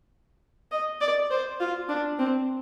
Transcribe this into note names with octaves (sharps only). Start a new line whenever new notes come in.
D#5
D5
C5
F4
D4
C4